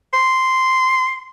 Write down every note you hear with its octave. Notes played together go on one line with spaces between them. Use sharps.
C6